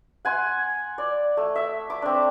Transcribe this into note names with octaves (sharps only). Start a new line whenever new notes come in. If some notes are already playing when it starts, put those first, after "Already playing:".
F#5 G#5 C6
D5
A3
E5
D6
C4 D4